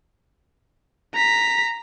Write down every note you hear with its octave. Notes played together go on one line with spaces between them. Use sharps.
A#5 B6